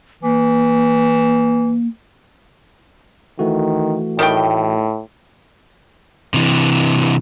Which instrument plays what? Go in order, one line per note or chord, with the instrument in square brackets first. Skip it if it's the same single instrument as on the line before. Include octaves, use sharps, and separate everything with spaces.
[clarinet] E3 [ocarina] A#3
[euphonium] D#3 [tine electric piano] E3 A3 F#4
[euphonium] A2 [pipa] D#3 G3 G5
[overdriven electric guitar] C3 E3